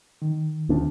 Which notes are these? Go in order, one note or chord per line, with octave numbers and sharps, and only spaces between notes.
D#3
D2 D4